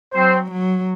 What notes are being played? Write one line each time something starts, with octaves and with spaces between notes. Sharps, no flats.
F#3 C4 C5
F#3